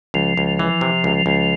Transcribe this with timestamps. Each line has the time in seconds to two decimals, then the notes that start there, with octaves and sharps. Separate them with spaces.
0.14 C#2 F3
0.37 C#2
0.59 E3
0.81 C3
1.04 C#2
1.26 C#2